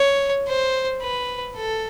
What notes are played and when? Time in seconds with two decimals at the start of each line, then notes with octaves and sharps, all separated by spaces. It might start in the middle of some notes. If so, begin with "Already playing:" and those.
Already playing: C#5
0.47 C5
1.02 B4
1.56 A4